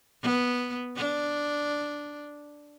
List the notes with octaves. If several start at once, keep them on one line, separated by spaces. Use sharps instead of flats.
B3
D4